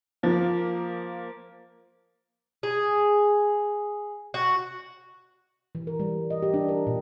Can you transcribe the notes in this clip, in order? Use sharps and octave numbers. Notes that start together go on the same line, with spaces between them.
F3 A#3
G#4
F#4
E3
A#4
G3
D#5
G4
D4
A#4
A#2